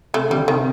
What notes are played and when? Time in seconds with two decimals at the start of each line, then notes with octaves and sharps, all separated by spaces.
0.14 C3 A3
0.30 D3 G3
0.48 C3 D#3